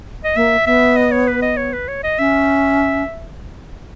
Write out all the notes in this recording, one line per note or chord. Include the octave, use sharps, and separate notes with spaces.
D#5
A#3 E5
B3 E5
D#5
C#5
B4
D#5
C#5
B4
C#5
D#5
C#4 E5